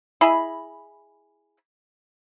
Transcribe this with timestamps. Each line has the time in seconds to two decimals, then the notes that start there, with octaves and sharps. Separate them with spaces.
0.21 E4 G#4 D#5 B5